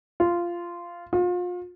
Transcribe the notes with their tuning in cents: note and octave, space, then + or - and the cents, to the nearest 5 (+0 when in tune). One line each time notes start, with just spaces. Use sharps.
F4 -10
F4 +35